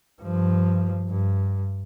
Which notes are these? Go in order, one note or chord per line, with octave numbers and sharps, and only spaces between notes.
G2 F3
G2